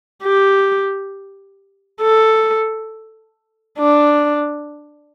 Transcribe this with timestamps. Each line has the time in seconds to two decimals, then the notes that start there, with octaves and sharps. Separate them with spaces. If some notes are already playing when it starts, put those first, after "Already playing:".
0.24 G4
2.01 A4
3.79 D4